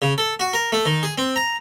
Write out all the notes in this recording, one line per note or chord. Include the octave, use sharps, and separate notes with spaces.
C#3
A4
F#4
A#4
A3
D#3
G#4
C4
A#5